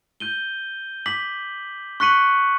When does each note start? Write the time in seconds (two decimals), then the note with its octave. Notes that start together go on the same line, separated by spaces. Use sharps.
0.20 G6 D#7 G7
1.06 D6 B6 F#7
2.00 C#6 F#6 B6 C#7 D#7 F#7